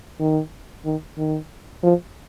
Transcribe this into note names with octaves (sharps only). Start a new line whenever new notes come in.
D#3
D#3
D#3
F3